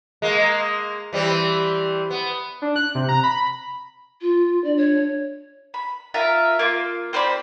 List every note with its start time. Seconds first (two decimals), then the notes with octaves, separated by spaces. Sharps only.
0.22 G#3 A#3
1.13 E3 G3 C4
2.11 B3
2.62 D4
2.76 F#6
2.95 C3
3.09 A#5
3.23 B5
4.21 F4
4.64 D4 D5
4.77 C#5
5.74 B5
6.14 F4 A#4 E5 F5
6.59 A#3 F4
7.13 C4 C5 D5 B5